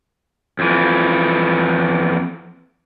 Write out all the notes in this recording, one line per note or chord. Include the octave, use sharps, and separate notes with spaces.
F2 E3